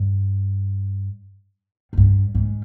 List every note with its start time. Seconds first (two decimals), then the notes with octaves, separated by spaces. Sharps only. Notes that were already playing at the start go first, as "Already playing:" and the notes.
Already playing: G2
1.93 G#2
1.97 G2
2.35 G#2